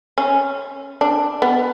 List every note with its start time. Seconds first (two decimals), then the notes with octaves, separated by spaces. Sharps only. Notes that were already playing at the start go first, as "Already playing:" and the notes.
0.18 C#4
1.01 D4
1.42 B3